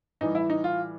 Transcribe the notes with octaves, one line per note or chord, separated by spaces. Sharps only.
A2 E3 G3 D#4
E4
D#4
F4